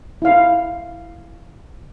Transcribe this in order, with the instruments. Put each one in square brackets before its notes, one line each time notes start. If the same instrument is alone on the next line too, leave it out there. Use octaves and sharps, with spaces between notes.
[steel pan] E4 F5